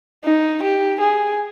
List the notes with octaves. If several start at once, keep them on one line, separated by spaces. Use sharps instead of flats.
D#4
G4
G#4